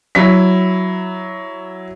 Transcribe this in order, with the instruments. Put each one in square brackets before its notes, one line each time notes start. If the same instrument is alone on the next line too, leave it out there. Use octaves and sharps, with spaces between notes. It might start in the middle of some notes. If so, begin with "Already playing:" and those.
[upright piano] F#3 E4 B6